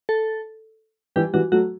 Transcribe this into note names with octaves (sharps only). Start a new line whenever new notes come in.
A4
E3 G3 G4
E3 G3 F#4
F#3 A3 F#4